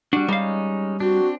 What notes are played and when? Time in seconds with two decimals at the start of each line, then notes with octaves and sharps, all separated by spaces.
0.13 G3 D4 F#4
0.28 G3 G#3 C#4 D#4 F5
1.00 C4 D4 F#4